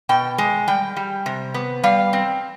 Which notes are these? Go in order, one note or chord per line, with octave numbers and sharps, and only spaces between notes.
B2 G5
G#3
G3 G5
G3
C3
B3
G3 F5
C4